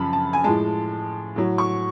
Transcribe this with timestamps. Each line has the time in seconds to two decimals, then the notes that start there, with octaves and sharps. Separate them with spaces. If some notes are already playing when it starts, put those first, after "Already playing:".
Already playing: F#2 C#3 F3 A5 B5
0.13 A5
0.33 G#5
0.44 A2 F3 G#3 A5
1.36 A2 F#3
1.58 C#6